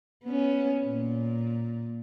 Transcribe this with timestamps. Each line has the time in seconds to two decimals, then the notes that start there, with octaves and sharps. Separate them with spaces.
0.24 B3 C#4
0.85 A#2